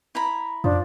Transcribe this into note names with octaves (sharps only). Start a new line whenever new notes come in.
E4 A#5 B5
F#2 F3 D4